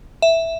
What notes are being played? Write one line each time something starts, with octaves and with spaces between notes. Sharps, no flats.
E5